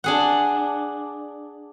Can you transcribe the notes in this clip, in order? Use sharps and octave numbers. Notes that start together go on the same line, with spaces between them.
D4 G#4 F#5